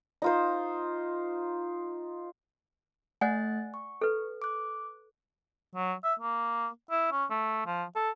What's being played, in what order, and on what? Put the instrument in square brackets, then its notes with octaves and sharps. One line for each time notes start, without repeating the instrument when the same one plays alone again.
[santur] D#4 F4 C5
[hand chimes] A3 F#6 A6 [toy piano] D5 F#5 G#5
[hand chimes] C#6
[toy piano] A4 B4
[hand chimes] D6 F#6
[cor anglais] F#3
E5
A#3
E4
C#4
A3
F3
A4